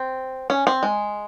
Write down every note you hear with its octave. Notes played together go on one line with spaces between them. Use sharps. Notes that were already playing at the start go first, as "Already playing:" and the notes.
Already playing: C4
C#4
C4
G#3